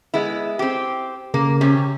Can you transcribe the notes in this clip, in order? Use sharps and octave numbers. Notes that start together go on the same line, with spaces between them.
G#3 B3 E4
C4 G4
C#3 A#3
C3 C#4 G4